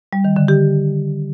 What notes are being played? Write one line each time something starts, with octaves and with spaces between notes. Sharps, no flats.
G3
D#3
D3
G4